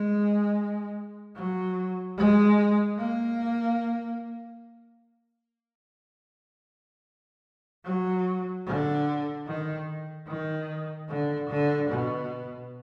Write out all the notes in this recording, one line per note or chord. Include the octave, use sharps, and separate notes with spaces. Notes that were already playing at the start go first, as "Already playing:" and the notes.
Already playing: G#3
F#3
G#3
A#3
F#3
D3
D#3
D#3
D3
D3
B2